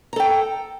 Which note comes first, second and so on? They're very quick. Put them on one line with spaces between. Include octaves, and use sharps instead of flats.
A#5 A4 G5